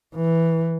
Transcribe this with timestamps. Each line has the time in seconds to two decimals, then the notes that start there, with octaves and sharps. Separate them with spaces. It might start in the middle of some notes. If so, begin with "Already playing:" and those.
0.15 E3